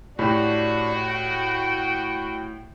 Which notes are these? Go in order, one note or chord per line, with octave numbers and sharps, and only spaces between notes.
A2 D4 F#4 G4
G5